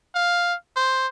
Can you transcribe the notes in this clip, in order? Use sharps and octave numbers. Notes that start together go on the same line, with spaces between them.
F5
C5